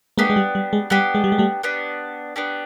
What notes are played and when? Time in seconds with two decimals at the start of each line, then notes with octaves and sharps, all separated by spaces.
0.18 G#3 A#3 B3 D4 G4
0.30 G#3
0.36 G3
0.55 G3
0.73 G#3
0.90 G3 B3 D4 G4
1.15 G#3
1.24 G3
1.32 G#3
1.38 G3 A3
1.63 B3 D4 G4
2.36 B3 D4 G4